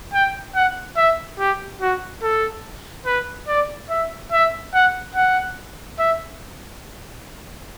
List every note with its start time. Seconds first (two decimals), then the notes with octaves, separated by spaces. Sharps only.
0.14 G5
0.56 F#5
0.97 E5
1.39 G4
1.82 F#4
2.23 A4
3.06 B4
3.48 D5
3.90 E5
4.32 E5
4.74 F#5
5.15 F#5
5.99 E5